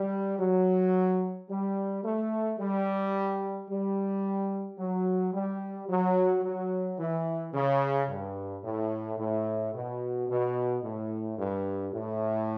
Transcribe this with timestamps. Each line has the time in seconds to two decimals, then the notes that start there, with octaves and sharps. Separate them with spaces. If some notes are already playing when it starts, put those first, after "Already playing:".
Already playing: G3
0.39 F#3
1.49 G3
2.04 A3
2.59 G3
3.69 G3
4.78 F#3
5.34 G3
5.89 F#3
6.44 F#3
6.99 E3
7.53 C#3
8.09 G2
8.64 A2
9.19 A2
9.74 B2
10.29 B2
10.84 A2
11.39 G2
11.93 A2